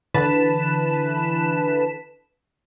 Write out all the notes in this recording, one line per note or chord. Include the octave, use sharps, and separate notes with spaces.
D3 E3 B4 A5 B6 E7